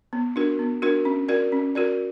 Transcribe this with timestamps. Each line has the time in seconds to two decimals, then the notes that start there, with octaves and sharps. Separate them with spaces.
0.13 B3
0.36 D4 F#4 A#4
0.59 B3
0.82 D4 F#4 A#4
1.05 C#4
1.28 F#4 A#4 D5
1.52 C#4
1.75 F#4 A#4 D5